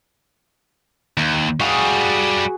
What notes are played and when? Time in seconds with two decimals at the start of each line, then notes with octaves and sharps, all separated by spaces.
1.17 D#2
1.60 G3 F#4 G#4 F5